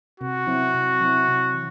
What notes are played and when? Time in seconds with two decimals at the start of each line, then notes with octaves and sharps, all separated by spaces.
0.20 C3 F#4
0.47 F#3 C4 E4
0.74 C3
1.01 F#3 C4 E4
1.28 C3
1.54 E3